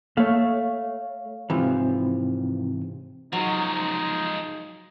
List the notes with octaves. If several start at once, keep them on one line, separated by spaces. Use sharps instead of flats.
A3 A#3 C#5 F5
G#2 C3 E3 F3 C4
F3 F#3 G#3 D#4